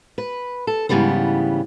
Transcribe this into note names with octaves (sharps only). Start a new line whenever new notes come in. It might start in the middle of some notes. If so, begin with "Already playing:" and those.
B4
A4
G#2 C#3 E3 G3 B3